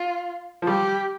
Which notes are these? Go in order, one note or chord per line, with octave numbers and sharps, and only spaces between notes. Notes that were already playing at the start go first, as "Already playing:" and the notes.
Already playing: F4
F3
G3 G4